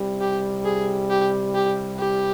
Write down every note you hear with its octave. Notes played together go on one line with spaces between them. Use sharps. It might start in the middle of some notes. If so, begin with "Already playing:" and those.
Already playing: C2 C3 G3
G4
G#4
G4
G4
G4